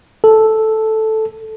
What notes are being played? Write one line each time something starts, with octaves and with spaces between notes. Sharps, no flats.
A4